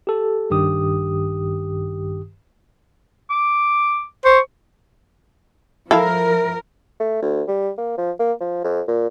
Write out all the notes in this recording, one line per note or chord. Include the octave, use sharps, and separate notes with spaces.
G4 A4
A#1 G2 D#3 G4 D#6
D6
C5 C#6
F3 E4 A4 A#4 F5
A3
D2
G3
A#3
F3
A#3
F3
F2
A#2